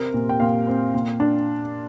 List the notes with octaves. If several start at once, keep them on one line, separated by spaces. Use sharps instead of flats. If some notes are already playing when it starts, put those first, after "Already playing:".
Already playing: C3 C4 A#4
A#2
G5
A#2 F5
C4
A#2
D4